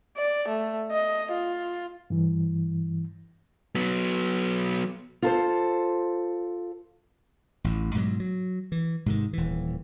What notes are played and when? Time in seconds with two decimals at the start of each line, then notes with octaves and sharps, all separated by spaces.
0.17 D5
0.48 A3
0.92 D#5
1.32 F4
2.10 G2 E3
3.75 F#3 B3
5.22 F4 A4 C5
7.64 A1 A2
7.95 G#2 B2 D#3 F#3
8.20 F#3
8.72 E3
9.06 G#2 C3 D#3
9.33 D#1 E3